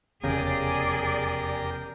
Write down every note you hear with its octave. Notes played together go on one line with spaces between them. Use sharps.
F1 E2 C#3 G4 G#4 A#4 D5